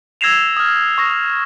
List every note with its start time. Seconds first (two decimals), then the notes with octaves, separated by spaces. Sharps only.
0.21 E6 G#6 A#6 C7 E7 F7
0.57 D#6 F6
0.98 C#6 D#6 A#6 F7